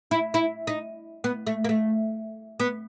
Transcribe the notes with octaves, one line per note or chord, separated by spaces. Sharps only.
E4
E4
D#4
B3
A3
A#3
A3
B3